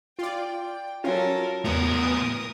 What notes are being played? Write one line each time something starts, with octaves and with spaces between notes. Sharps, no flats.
F4 D5 G5
F#3 C#4 F4 A4 A#4
E2 A2 B3 A#4 A#5 D#6